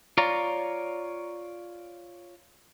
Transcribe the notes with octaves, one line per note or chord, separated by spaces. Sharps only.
F4 C#5 D5 A#5